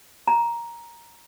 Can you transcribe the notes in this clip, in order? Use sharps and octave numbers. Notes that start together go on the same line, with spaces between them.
A#5